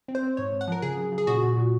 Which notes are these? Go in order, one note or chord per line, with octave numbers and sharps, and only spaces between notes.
C4
C5
C4
G#2 C#5
G#2
F#5
F3 A#4
C#3 G#4
F#3
C#3
G#4
A#2 F#4
A#2
A#2